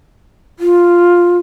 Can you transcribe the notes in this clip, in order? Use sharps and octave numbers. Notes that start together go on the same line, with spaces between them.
F4